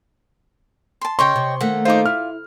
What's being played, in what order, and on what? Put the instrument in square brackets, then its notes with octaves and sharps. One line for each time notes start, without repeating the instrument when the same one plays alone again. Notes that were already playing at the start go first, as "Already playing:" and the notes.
[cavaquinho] A5 C6
[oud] C#3 C#4 [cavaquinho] C#5 D#5 G5 [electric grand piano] C6 C#6
[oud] C3
[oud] D#3 A3 A#3 [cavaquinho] F#5
[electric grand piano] D#4 C5 [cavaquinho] F4 D6
[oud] E4 [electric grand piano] F6